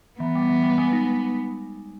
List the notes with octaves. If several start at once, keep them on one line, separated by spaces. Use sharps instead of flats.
E3 B3
G3
E3
G3
G#3
D#4